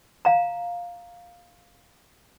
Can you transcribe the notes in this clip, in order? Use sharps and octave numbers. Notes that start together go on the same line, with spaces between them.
F5 A#5